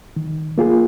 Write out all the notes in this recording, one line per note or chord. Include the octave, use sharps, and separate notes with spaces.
D#3
A#3 F4 G#4